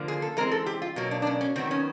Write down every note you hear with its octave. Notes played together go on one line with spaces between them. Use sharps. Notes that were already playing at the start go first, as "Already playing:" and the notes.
Already playing: D3 F3 A#3
G#4
A4
E3 G#3 C4 A#4
A4
G4
F4
B2 F#3 A#3
D4
D4
C#4
C#4
D#3 F#3 B3 C4
C#4